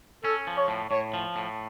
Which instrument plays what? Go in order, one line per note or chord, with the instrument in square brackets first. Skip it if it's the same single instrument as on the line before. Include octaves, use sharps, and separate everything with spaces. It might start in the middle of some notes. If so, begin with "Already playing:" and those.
[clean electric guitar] C#4 [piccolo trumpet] A4
[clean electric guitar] F3
[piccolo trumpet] C#5
[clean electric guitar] A2
[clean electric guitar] A2 [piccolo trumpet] C#5
[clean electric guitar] F3
A2